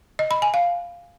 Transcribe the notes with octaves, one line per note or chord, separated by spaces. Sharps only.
D#5
B5
G#5
F5